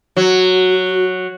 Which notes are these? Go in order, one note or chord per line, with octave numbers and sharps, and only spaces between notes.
F#3 F#4